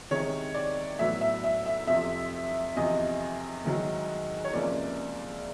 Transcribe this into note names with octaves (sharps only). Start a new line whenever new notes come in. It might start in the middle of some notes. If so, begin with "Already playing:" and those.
C3 D#3 G#3 C#5
D5
A2 F#3 B3 E5
E5
E5
E5
F2 C3 F3 E5
E2 C3 F3 D#5
G#2 D#3 F#3
C#5
C#2 C3 F3 A#3 D5